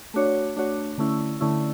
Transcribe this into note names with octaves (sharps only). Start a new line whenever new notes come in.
A3 D4 F#4 C#5
A3 D4 F#4 C#5
D3 A3 C#4 E4
D3 A3 C#4 E4